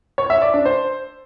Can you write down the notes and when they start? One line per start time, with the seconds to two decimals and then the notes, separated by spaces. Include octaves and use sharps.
0.18 C#5
0.30 E5
0.42 D5
0.54 D4
0.65 C5